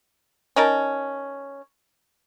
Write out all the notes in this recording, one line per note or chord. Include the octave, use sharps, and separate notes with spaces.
C#4 D#4 A#4 A5